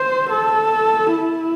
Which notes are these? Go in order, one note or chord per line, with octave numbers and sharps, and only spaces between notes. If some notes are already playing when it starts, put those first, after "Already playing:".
Already playing: C5
A4
E4